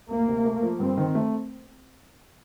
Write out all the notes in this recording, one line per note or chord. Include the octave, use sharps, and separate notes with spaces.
D2 A#3
C3
A3
F3
G2 C4
D#3
A3